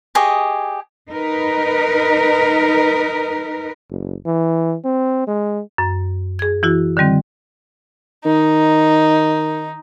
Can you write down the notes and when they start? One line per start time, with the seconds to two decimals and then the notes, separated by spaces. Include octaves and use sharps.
0.15 G4 G#4 D#5 C#6
1.11 D#4 A#4 B4
3.90 F#1
4.26 E3
4.84 C4
5.27 G#3
5.78 F#2
6.39 G#4 G#6
6.63 E3 E4 F#4
6.97 D3 D#3 G3 C4
8.25 D#3 D#4